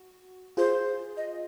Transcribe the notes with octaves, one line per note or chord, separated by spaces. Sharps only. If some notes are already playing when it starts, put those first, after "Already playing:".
Already playing: F#4
F4 G#4 C5
D#5